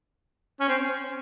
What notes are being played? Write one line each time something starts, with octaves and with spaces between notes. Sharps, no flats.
C#4
C4